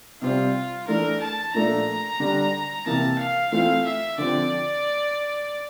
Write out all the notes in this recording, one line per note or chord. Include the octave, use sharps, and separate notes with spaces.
C3 G3 C4 F4
E3 A3 D4 A#4
A5
A#2 F3 A3 D4 A#5
D3 G3 D4
C3 E3 A#3 A5
F5
E3 A3 C4 F4 F5
E5
D3 F3 C4 D5